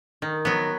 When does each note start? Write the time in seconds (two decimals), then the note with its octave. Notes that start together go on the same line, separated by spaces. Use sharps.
0.22 D#3
0.45 F#3 B3